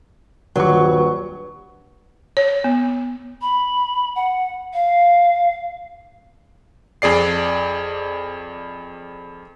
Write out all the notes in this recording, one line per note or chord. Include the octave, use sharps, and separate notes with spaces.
D#1 G2 F#3 C#6
C#5
B3
B5
F#5
F5
F2 G#4 D5 C7